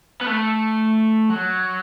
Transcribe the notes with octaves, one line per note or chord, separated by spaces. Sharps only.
B3
A3
F#3